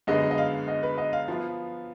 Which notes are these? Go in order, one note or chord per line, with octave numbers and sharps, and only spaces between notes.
F#2 D3 G#3 B3 D#5
D#5
F5
D#5
B4
D#5
F5
F3 B3 F4